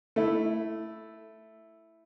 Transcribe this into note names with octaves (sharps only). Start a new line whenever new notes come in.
A3 E4